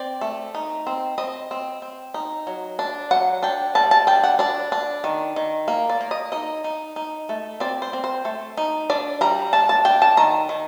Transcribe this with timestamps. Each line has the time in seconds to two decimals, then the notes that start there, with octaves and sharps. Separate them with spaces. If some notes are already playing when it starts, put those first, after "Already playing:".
Already playing: C4 D5
0.21 A3
0.54 D#4
0.87 C4
1.18 C4 D#5
1.51 C4
1.82 C4
2.14 D#4
2.47 F#3
2.79 D4
3.11 F#3 F#5
3.42 D4 G5
3.75 G3 A5
3.91 A5
4.07 D4 G5
4.23 F#5
4.39 D4 D5
4.72 D4
5.04 D#3
5.36 D#3
5.68 A#3
5.89 D5
6.01 A#3
6.11 D#5
6.32 D#4 D#5
6.64 D#4
6.96 D#4
7.29 A3
7.60 C4 D5
7.82 C5
7.93 C4
8.04 C5
8.25 A3
8.57 D#4
8.90 D4 D5
9.21 G3 A#5
9.53 D4 A5
9.69 A5
9.85 D4 G5
10.02 A5
10.17 D#3 A#5
10.49 D#3